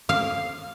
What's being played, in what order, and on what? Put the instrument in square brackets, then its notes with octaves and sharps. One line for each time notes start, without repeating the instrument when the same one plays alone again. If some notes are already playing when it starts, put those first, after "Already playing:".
[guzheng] F5